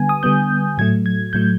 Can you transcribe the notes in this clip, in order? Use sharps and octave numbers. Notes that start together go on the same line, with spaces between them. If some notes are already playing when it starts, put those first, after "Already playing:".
Already playing: D3 G3 B3 G#5
D#6
D3 G3 B3 G6
A2 F#3 A3 G#6
G#6
A2 F#3 A3 G6